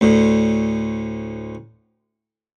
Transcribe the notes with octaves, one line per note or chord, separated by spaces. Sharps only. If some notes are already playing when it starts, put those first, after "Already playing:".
D2 A2 D3